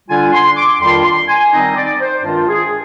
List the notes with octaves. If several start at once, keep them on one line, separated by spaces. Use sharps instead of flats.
D3 G3 D4 F4 G#5
C6
D6
F2 D#3 G3 D4 F4 C6
C6
G#5
D#3 G3 C4 D#4 D#5
D5
C5
G2 D#3 G#3 D4 F4
G#4